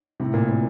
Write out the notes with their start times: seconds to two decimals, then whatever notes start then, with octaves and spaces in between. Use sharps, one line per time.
0.20 A2 C3
0.34 A#2
0.49 A#2